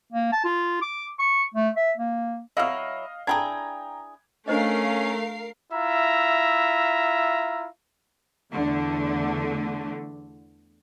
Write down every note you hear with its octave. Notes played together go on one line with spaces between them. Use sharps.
A#3
A5
F4
D6
C#6
A3
E5
A#3
F#3 E4 D#5 F5 F6
D4 E4 G#4 G5 A#5 G#6
A3 C#4 D4 A#4 C5 D#5 F5 C7
E4 F4 E5 A#5
E2 D3 A3